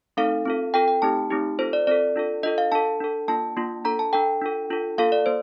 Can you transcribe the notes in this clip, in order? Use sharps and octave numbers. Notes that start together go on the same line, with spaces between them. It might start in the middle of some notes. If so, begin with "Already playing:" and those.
A3 C4 D#4 A4 F5
C4 F4 A4
C4 F4 A4 G5
G5
A3 C4 D#4 G4 A5
A3 C4 D#4 G4
C4 F4 A4 C5
D5
C4 F4 A4 D5
D4 F4 A4
D4 F4 A4 D#5
F5
D4 A4 A5
D4 A4
A#3 D4 F4 A5
A#3 D4 F4
D4 A4 A#5
A5
D4 A4 G5
D4 F4 A4
D4 F4 A4
A#3 F4 A4 F5
D5
A#3 C5